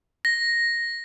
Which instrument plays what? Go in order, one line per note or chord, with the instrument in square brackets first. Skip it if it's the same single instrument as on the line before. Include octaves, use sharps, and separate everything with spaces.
[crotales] A#6